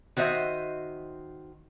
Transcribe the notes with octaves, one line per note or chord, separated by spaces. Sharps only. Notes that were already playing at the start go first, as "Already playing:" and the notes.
D#3 F#4 C5 D#5 E5